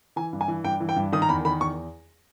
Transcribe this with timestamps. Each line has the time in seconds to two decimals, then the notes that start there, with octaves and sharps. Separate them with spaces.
0.16 E3 G#5
0.33 G2
0.41 G#5
0.48 E3
0.64 G2 G5
0.80 E3
0.89 G5
0.96 G2
1.12 D#3 D#6
1.22 A#5
1.29 E2 B5
1.45 D#3 B5
1.60 E2 C#6